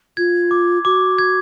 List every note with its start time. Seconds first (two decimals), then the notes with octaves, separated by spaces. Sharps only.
0.17 F4 G#6
0.51 D6
0.85 F#4 D6
1.18 G#6